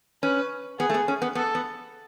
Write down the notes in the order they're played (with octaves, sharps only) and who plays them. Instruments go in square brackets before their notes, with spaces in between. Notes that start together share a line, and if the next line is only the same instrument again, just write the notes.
[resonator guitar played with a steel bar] C#4 [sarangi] B4
[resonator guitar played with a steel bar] B3 [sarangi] G#4
[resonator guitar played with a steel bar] A3
B3
C#4
B3
[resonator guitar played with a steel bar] B3 [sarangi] A4
[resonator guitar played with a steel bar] B3